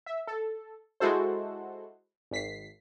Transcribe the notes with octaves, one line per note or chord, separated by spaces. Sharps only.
E5
A4
G#3 E4 F#4 A4 C5
G#1 B6 C7